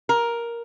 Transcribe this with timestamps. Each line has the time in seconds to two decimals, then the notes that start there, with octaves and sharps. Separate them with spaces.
0.09 A#4